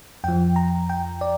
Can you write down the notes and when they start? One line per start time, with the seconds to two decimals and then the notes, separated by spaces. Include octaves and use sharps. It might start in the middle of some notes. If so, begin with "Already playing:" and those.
0.24 F2 F3 G5
0.56 A#5
0.89 G5
1.21 D5